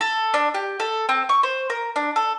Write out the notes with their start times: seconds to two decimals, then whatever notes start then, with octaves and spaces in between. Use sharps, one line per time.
0.01 A4
0.34 D4
0.54 G4
0.80 A4
1.09 C4
1.29 C#6
1.43 C5
1.70 A#4
1.96 D4
2.16 A4